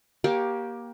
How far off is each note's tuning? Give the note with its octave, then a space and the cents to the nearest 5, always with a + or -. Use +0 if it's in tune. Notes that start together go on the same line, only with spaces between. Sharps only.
A#3 +20 G4 +0 C#5 +0